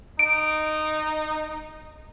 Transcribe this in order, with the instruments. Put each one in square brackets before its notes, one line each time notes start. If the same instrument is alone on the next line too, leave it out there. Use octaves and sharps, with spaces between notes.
[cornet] D#4 [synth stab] D7